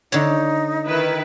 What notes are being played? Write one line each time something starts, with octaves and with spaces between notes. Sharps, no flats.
D3 D#4 C#5
D#3 E4 B4